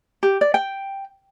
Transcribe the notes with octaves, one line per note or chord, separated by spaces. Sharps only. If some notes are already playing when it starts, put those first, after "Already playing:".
G4
D5
G5